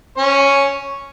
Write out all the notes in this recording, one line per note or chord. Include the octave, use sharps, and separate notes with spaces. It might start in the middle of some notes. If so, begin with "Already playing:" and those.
C#4 C#5